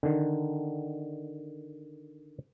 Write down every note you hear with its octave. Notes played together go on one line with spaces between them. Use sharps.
D3 D#3